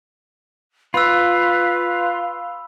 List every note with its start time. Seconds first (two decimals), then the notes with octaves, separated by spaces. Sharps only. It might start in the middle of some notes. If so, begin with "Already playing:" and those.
0.94 F4 B4 B5 E6